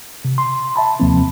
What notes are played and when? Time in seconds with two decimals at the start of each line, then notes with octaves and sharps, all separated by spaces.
0.25 C3
0.38 C6
0.76 E5 A5 B5
1.00 D#2 C3 F3 A#3 C4